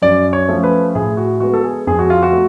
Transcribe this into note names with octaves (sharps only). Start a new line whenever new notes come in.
F#2 D5
C#5
F3 A3 C#4
B4
A2 G#4
F#4
G#3 B3 F#4
A4
G#4
F2 G#4
F#4
F4
F#4
A3